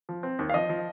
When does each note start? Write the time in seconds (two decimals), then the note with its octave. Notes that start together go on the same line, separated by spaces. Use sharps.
0.09 F3
0.23 C4
0.39 D#2
0.49 F5
0.54 F3 D#5
0.69 F3